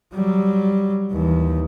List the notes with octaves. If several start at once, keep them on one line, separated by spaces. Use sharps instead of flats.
F#3 G3
D#2 E3